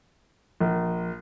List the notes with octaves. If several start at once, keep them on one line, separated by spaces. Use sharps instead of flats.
A#1